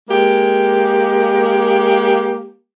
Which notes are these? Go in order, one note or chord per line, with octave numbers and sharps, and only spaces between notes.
G#3 A#3 G4